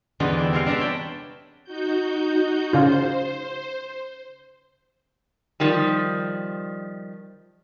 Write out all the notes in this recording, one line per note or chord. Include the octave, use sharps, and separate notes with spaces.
E2 D3 D#4 F4 B4 C5
D4 E4 G4
C3 G#3 F5 G5
D4 A#4 B4 D5 E5
C#5 G5 A5 B5
D#4 F#4 G6
C#3 F4 C5
D#3 F3 G3